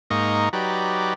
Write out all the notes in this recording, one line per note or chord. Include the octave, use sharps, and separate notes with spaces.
G#2 A#3 D#4 D#5 C#6
F#3 D#4 G4 B4 D5